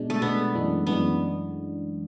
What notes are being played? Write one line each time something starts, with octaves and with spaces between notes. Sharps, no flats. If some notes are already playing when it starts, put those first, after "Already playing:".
Already playing: B2 G#3 D4
A3
B2 G#3 B3 D4
F#2 E3 G#3 D4
F#2 E3 G#3 B3 D4